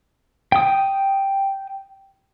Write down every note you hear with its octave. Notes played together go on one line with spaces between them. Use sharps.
G5 D#6